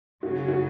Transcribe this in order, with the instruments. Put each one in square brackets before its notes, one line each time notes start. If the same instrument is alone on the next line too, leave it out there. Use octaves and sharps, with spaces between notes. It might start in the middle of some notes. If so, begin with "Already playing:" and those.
[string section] F#2 C#3 F#3 [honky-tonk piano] F#4
[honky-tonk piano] F#4